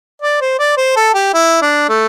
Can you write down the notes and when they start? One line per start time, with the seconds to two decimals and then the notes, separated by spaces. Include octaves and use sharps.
0.22 D5
0.41 C5
0.59 D5
0.77 C5
0.96 A4
1.14 G4
1.34 E4
1.62 D4
1.89 A3